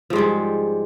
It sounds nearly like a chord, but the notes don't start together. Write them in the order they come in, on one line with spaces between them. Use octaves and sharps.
F3 G#2 G3 G#3